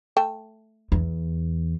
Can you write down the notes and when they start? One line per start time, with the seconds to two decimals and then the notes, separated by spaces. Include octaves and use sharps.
0.17 A3 G5 A5
0.92 E2